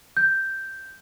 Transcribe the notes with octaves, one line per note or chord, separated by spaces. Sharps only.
G6